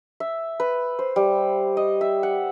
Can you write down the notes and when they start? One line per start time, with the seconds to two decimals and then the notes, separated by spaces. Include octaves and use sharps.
0.20 E5
0.60 B4
0.99 C5
1.16 G3
1.77 D#5
2.01 E5
2.23 F#5